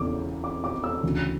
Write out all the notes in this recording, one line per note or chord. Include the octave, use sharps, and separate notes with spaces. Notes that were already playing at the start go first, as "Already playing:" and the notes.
Already playing: E2 C#3 D6
D6
D6
E6
D2 C#3 E3